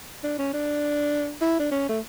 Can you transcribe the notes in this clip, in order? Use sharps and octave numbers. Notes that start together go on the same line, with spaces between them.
D4
C#4
D4
E4
D4
C#4
A3